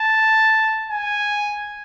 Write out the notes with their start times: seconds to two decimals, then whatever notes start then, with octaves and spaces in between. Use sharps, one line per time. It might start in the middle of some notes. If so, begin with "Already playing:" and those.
Already playing: A5
0.91 G#5